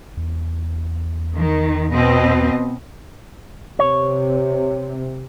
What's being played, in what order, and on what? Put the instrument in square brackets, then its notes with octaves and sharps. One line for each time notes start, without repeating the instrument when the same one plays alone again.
[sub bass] E2
[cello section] D#3
B2 C4 D#5
[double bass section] C3 [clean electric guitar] C#5